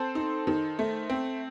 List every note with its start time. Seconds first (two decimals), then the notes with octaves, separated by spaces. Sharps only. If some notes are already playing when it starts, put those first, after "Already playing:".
Already playing: C4 A4 C5
0.15 D#4
0.47 D#3
0.79 A3
1.10 C4